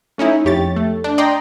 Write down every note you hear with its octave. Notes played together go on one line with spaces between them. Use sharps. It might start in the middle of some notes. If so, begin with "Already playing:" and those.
A3 C#4 D#4 E4
F2 G4 C#5 A6
A3
D4
D5 D#5 G5 A#5 C6